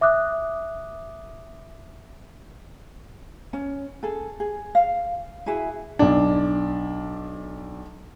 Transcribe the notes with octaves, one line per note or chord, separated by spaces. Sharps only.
E5 D6 D#6 F#6
C#4
G#4 A4
G#4
F5
E4 F#4 G#4 E5
B1 D4